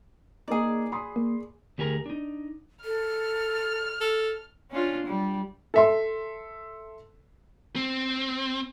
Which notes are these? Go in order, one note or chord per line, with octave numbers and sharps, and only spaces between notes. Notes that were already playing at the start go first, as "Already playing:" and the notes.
A#3 D#4 G#4 D5
B5 C6 D#6
A#3
D2 G4 G#4 A#4 A#5
D4 D#4
A4 F6
A4
C#4 D4 F4
G3
A4 E5 C6
C4